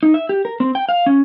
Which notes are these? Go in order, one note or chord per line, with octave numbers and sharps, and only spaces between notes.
D#4
E5
G4
A#4
C4
G5
F5
C#4